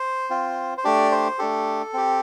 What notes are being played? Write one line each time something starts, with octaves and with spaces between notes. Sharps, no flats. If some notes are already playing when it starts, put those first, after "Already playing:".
Already playing: C5
C4 F4
C5
A3 D4 G4 D5
C5
A3 D4 G4 A4
C4 G4